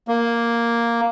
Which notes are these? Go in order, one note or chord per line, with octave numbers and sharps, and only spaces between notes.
A#3